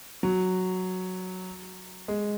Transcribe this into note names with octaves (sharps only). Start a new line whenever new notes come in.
F#3
G#3